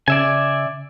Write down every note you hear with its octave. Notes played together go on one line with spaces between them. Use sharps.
C#3 D5 E5 G#5